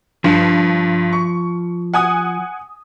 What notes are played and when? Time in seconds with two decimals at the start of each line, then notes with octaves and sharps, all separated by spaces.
0.24 G2 F3
1.13 C#6
1.94 F#5 G#5 D#6